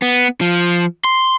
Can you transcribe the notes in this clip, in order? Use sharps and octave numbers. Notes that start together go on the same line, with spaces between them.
B3
F3
C6